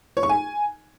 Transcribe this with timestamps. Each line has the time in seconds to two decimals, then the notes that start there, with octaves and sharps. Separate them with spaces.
0.17 C#5
0.23 C#6
0.29 G#5